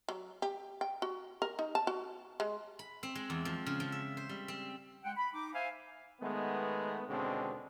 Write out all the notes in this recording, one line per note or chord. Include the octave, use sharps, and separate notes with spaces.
F#3
G4
G5
F#4
A#4
D#4
A5
F#4
G#3
B5
C4
G#3
E2
F3
C#3
F3
E5
C5
G3
C4
G#3 F#5 G5
B5
D#4 D6
C5 E5 F5 G#5
D#3 G#3 A3 B3
D#2 B2 D3 G#3 C4 C#4